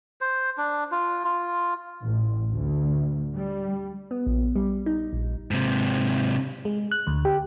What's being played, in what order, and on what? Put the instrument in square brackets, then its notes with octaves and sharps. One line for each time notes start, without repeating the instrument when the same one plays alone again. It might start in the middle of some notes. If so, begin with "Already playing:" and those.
[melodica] C5
D4
F4
F4
[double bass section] A1
D2
G3
[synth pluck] B3
A#1
G3
D#4
A#1
[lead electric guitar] G#2 C3
[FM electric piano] G#3
F#6
D2
G4